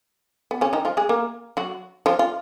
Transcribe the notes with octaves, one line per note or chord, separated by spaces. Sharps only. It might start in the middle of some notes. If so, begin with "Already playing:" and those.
B3
C#3 C#4
D#3 D#4
F3 F4
G#3 G#4
A#3 A#4
F#3 F#4
F3 F4
F4